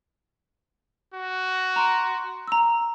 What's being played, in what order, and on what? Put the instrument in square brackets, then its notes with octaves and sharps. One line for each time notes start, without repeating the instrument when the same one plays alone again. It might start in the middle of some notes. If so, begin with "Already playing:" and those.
[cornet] F#4
[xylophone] A#5 C6 D7
A#5 E6